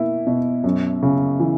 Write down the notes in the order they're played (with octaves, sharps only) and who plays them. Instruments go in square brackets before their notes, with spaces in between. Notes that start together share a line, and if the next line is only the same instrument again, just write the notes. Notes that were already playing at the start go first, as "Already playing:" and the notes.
Already playing: [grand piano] B2 A#3 E4
B2
F#2
C#3
E3